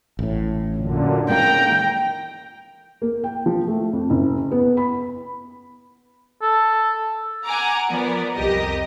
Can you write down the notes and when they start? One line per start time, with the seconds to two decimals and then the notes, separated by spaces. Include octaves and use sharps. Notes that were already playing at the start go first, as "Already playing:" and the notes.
0.19 A1 A2
0.75 F#2 A#2 D3
1.29 G#3 A#3 C#4 G5 A#5
3.02 A#3
3.24 G5
3.46 F3
3.67 A3
3.93 F2
4.10 F#1
4.51 B3
4.77 B5
6.42 A4
7.45 F#5 G#5 A#5 D6
7.91 F3 B3 A#4 D5
8.36 C2 F2 G4 A#4 D#5 A#6